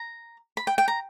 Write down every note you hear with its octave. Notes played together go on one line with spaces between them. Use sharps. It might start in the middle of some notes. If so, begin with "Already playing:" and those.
Already playing: A#5
B5
G5
G5
A#5